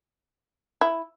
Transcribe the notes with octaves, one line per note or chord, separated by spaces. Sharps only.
E4